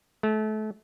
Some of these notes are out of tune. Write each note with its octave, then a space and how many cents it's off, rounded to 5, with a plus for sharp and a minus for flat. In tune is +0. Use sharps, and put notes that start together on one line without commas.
A3 -30